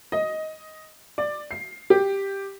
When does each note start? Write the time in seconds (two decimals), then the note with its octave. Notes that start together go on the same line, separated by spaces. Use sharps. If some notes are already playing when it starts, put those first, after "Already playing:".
0.12 D#5
1.18 D5
1.51 C7
1.90 G4